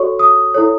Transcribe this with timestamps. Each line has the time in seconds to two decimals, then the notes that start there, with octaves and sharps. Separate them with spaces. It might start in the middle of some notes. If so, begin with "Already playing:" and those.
Already playing: F#4 A4 C#5 C#6
0.19 D#6
0.54 E4 A4 C#5